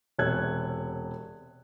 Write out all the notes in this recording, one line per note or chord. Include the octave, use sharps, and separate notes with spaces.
E1 C3 C#5 E6 F#6 G#6